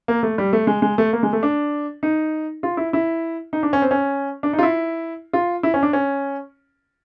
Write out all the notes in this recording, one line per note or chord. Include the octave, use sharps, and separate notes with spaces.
A#3
A3
G3
A3
G#3
G#3
A3
A#3
G#3
A3
D4
D#4
F4
E4
E4
D#4
D4
C#4
C4
C#4
D4
D#4
F4
E4
F4
E4
C#4
D4
C#4